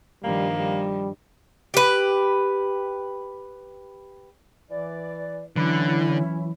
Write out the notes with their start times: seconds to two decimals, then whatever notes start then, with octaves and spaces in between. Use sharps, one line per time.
0.24 G2 D#3 F3 G3 A#3
0.56 G3
1.74 G4 B4
4.70 E3 D5
5.56 D3 E3 F#3 C#4 E4 B5